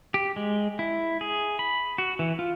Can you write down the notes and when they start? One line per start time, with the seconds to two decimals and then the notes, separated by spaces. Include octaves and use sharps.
0.14 G4
0.36 G#3
0.79 E4
1.21 G#4
1.59 B5
1.98 F#4
2.19 E3
2.39 F4